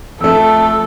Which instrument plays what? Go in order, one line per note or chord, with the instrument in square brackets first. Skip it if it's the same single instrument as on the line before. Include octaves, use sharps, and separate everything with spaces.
[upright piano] F2 A3 [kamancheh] A4 [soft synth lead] E6